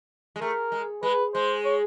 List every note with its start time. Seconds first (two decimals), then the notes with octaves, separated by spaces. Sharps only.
0.36 G#3
0.41 A3 A#4
0.72 G#3
1.03 G#3 B4
1.34 G#3 C5
1.65 C#5